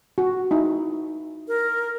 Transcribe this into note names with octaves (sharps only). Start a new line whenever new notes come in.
F#4
D#4 E4
A#4